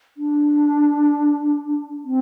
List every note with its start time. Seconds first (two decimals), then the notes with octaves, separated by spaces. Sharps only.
0.17 D4
2.05 C4